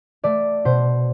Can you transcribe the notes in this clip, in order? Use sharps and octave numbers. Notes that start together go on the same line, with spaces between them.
A3 D5
B2 C5